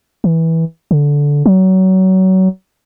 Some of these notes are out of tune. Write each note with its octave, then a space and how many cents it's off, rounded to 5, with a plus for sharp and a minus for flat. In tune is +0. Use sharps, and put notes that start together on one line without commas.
E3 -15
D3 -15
F#3 +25